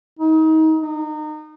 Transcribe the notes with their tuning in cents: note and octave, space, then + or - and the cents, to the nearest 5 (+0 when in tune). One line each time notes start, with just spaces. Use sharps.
D#4 +30
D#4 -30